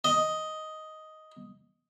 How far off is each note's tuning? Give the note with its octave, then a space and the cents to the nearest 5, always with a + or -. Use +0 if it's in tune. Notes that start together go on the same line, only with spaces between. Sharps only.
D#5 +5